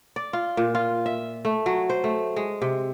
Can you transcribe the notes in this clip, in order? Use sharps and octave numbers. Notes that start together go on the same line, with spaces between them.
D5
F4
A#2
F4
E5
A3
F#3
C5
A3
G#3
C3